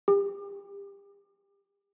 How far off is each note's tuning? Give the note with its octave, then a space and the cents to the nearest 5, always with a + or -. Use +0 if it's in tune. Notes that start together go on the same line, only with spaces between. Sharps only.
G4 +35